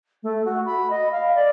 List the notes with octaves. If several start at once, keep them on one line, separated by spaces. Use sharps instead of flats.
A3
F#4
B5
D#5
F5
D5